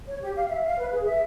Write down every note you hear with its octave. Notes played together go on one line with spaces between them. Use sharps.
C#5
G4
F5
E5
F5
B4
G#4
E5